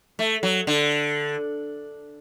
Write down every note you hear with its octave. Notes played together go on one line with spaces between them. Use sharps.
A3
F#3
D3